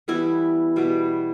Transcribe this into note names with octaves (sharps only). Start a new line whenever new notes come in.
E3 G3 B3 E4
B2 G3 B3